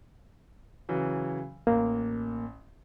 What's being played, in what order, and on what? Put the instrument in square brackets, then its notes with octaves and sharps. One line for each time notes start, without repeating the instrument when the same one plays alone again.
[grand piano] C#3 E3 F#3
[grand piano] A1 [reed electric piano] A#3